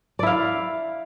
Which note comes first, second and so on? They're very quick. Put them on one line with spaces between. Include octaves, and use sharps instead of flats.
D5 E4 F5